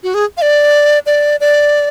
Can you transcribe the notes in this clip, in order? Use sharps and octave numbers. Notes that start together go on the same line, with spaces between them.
F#4
G#4
F5
D5
D5
D5